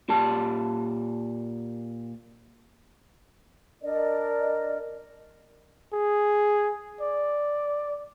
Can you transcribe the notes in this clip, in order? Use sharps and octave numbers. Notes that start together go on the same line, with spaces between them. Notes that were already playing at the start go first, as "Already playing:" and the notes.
A#2 G4 A5
D4 A#4 D5 D#5
G#4
D5